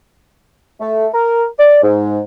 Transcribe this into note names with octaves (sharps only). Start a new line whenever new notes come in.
A3
A#4
D5
G#2